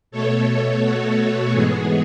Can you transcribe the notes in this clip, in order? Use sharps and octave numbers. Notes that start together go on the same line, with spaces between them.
B2 A3 A4 C#5
A4 C#5
F#4 A4
G#2 E3 G#3 B3 G#4